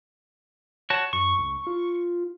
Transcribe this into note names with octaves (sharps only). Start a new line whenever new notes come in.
F#4 C#5 A5
F#2 C#6
C#2
F4